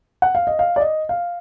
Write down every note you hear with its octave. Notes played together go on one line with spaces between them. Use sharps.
F#5
F5
D#5
F5
D5
D#5
F5